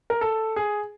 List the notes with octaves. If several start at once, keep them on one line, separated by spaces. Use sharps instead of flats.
A#4
A4
G#4